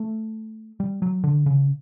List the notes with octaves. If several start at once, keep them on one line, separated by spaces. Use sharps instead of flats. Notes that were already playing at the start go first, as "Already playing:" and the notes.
Already playing: A3
G3
F#3
D3
C#3